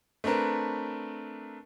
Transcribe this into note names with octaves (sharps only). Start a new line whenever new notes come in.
A3 C4 D4 A#4 B4